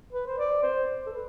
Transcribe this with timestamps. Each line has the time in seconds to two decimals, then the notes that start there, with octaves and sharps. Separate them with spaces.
0.13 B4
0.27 C5
0.39 D5
0.62 C5
1.06 A4
1.13 B4